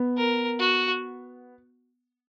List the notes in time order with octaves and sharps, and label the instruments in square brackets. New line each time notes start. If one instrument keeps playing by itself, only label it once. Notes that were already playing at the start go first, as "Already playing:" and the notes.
Already playing: [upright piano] B3
[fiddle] A#4
F#4